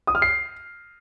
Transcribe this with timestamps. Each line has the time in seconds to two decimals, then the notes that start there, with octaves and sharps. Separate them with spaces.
0.07 D#6
0.15 F6
0.22 C7